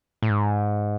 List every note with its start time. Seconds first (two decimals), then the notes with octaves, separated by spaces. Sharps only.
0.23 A2
0.30 G#2